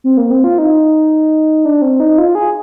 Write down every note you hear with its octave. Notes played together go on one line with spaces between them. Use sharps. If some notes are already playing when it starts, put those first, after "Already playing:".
C4
A#3
C4
F4
D#4
D4
C4
D#4
F4
G#4